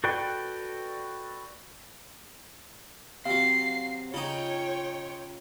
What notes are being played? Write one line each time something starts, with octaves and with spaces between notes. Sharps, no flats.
F#4 A4 B4 D5 G5
C3 F#3 F5 C7
C#3 D#4 F4 C#5 G5